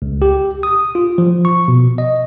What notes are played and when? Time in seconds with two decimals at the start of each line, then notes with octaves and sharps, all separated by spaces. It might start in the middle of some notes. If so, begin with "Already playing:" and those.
0.02 C#2
0.22 G4
0.63 D#6
0.95 F4
1.18 F3
1.45 C#6
1.68 B2
1.98 D#5